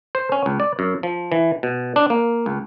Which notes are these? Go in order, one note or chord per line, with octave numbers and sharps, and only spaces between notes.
C5
C#4
C#2
D5
F#2
F3
E3
B2
D4
A#3
C#2